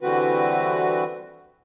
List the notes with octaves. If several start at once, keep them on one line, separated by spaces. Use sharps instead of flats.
D3 E3 G3 C4 F#4 B4